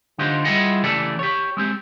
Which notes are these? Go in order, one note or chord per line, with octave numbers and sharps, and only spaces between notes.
D3 D4 D#4 F4 G4 C5
G3 E4 F4 G#4 D#5 F#5
C#3 E3 A3 G4 A4 D5
G4 C#5
G#3 C4 G4